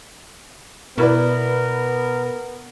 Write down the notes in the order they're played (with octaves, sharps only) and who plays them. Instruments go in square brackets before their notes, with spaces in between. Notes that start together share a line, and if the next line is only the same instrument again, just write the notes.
[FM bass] B2 [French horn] B3 [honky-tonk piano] E4 B4 D5 [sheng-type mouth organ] A#4